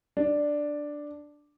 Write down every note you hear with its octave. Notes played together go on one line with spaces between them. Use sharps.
D4